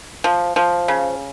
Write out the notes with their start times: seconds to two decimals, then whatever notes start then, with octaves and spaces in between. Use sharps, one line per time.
0.24 F3
0.56 F3
0.88 C#3